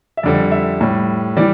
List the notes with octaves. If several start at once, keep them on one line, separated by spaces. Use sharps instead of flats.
E5
F2 D3 G3 D5
E5
A2 G3
E3 G3 D5